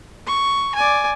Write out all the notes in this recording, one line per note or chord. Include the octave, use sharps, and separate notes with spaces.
C#6
D5 G#5